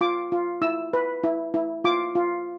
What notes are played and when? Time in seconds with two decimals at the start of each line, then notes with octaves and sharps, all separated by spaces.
0.01 F4 D6
0.32 F4
0.62 E4 E6
0.93 B4
1.23 E4
1.54 E4
1.84 F4 D6
2.15 F4